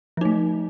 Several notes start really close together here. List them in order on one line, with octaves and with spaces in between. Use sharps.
F3 D#4 A3